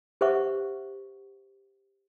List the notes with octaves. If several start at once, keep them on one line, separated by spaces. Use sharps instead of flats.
G4 B4 C5 E5 F#5 C#6